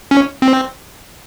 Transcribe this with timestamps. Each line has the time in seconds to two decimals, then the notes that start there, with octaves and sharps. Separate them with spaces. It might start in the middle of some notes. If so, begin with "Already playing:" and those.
0.11 C#4
0.42 C4